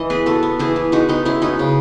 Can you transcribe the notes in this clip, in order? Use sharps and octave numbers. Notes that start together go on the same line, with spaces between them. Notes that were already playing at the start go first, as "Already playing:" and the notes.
Already playing: E3 D#5
B3 G#4 B4
B3 F#4 A4
B3
E3 E4 G#4
B3
G#3 D#4 F#4
B3 D#4
G#3 C#4 E4
B3 D#4 F#4
C#3